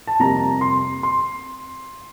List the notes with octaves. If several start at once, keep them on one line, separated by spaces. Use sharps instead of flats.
A5
F2 C3 G3 A#3 A#5
C6
C6